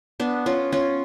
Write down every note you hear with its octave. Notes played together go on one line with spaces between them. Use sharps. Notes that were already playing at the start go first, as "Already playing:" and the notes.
B3 D4
C#4 F4
C#4 F4